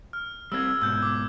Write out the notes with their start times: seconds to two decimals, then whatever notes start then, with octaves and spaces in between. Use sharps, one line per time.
0.13 F6
0.52 G3 C4 E6 G#6
0.82 G#2 B2 E6 G6
1.02 D6